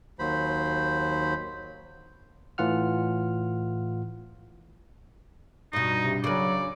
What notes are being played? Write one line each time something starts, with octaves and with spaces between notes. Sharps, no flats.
D#2 F#3 C5 B5
A2 E3 F4 F#5 F6
G2 B2 D#4
C3
C#3 F#3 B4 D5